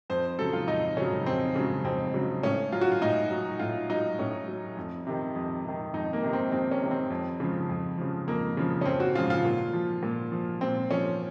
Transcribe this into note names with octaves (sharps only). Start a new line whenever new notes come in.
F2 C5
C#3 F#3 A4
F4
F2 D#4
C#3 F#3 C#4
F2 C4
C#3 F#3
F2 C4
C#3 F#3
A2 C#4
F#3 F4
F#4
F4
A2 D#4
F#3
A2 F4
F#3 D#4
A2 C#4
F#3
F2
C3 D#3
F2
C3 D#3
F2 D#4
A#3
C3 D#3
C4
F2 C4
C#4
C3 D#3
C4
F2
C#3 F3
F2
C#3 F3
F2 A#3
C#3 F3
C#4
F2 C4
F#4
C#3 F3 F4
F4
A#2
F3
A#2
F3
A#2 C4
F3 C#4